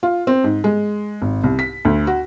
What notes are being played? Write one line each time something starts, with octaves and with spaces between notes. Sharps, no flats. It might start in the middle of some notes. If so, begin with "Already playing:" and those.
F4
C4
G#2
G#3
G#1
C2
B6
D2
F#4